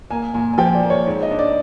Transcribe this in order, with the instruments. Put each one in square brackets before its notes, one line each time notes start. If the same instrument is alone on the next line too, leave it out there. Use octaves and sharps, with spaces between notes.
[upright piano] A#3 [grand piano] G#5
[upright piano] A#2 [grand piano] G#5
[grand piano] G#5
[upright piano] F3 [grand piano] G5
[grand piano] D5
[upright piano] A#3
[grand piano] C#5
[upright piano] G#2
[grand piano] D#5
[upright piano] D4
[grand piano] D5